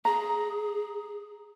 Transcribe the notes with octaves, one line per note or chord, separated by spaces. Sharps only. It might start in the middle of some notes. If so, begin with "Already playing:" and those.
G#4 A#5